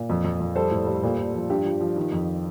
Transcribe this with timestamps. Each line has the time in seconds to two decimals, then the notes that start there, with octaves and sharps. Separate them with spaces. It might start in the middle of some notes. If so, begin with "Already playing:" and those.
Already playing: A#2
0.09 F2
0.24 F2
0.40 F2
0.55 G3 A4 C5
0.71 A2
0.87 G3
1.03 A#2
1.18 A#2
1.34 F3
1.50 G2 G4
1.66 F3
1.81 F3
1.96 D#3
2.12 F2